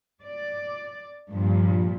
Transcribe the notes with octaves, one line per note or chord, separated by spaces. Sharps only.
D5
G2 A#2 F3